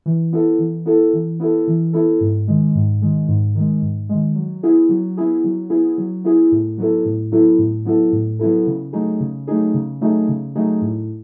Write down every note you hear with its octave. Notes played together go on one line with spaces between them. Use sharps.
E3
B3 E4 A4
E3
B3 E4 A4
E3
B3 E4 A4
E3
B3 E4 A4
G#2
D#3 G#3
G#2
D#3 G#3
G#2
D#3 G#3
G#2
D#3 G#3
F#3
B3 E4 G#4
F#3
B3 E4 G#4
F#3
B3 E4 G#4
F#3
B3 E4 G#4
A2
F#3 B3 E4 A4
A2
F#3 B3 E4 A4
A2
F#3 B3 E4 A4
A2
F#3 B3 E4 A4
C#3
F#3 A3 D#4 G#4
C#3
F#3 A3 D#4 G#4
C#3
F#3 A3 D#4 G#4
C#3
F#3 A3 D#4 G#4
A2